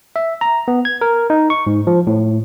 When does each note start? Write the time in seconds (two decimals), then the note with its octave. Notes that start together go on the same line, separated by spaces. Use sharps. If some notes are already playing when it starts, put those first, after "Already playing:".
0.16 E5
0.41 A#5
0.68 B3
0.85 G#6
1.01 A#4
1.30 D#4
1.50 C#6
1.67 G#2
1.87 F3
2.07 A2